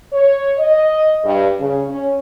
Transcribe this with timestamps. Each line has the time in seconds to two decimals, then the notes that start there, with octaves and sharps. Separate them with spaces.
0.12 C#5
0.58 D#5
1.24 G2
1.59 C#3
1.89 C#4